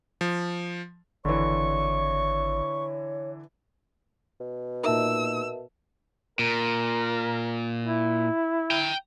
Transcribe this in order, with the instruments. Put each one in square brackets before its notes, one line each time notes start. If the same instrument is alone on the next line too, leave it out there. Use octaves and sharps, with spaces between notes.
[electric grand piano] F3
[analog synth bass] G#1 [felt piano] D3 E3 [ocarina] C#5 [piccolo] C#6
[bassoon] B2
[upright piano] A#2 D#4 [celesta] A#4 E5 A5 [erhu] E6
[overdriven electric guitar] A#2 [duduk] A#4
[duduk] E4
[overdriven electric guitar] G5 A#5